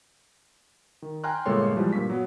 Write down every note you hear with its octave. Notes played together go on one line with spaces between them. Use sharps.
D#3
G5 G#5 A#5 C6 F6 F#6
G1 A#2 G#3 A4 C#5 C6
E3 F3 G3 G#3
G2 A#2 C#6 B6
F#3 B3